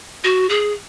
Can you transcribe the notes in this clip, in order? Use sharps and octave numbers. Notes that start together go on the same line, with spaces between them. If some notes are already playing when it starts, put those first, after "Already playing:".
F#4
G#4